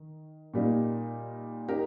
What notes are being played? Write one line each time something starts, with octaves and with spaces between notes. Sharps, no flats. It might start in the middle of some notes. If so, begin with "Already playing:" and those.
Already playing: D#3
A#2 G3 A#3 D#4
D#4 G4 A#4